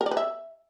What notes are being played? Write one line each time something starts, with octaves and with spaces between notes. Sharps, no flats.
A#4
D5
B4
E5